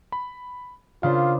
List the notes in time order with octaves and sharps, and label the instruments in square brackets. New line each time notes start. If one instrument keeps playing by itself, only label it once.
[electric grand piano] B5
[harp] C#3 D4 C5 [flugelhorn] F4 [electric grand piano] F5